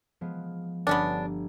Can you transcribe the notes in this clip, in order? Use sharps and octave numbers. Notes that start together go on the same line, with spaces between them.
F3 G#3 B3
G1 B3 C#4 D4